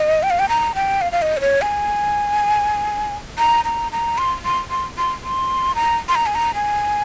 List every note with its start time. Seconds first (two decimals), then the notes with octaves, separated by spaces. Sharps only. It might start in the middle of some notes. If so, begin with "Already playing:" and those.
Already playing: D#5
0.23 G5
0.30 F5
0.39 G5
0.49 A#5
0.75 G5
1.01 F5
1.12 F5
1.22 D#5
1.37 C5
1.41 C#5
1.62 G#5
3.38 A#5
3.65 A#5
3.92 A#5
4.18 C6
4.45 C6
4.70 C6
4.98 C6
5.24 C6
5.75 A#5
6.09 C6
6.15 A#5
6.26 G#5
6.35 A#5
6.55 G#5